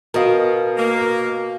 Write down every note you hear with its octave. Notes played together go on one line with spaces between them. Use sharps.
B2 B3 A#4 D#5 F5
A#3